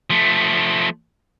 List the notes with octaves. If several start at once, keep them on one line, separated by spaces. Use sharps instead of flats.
F3 A3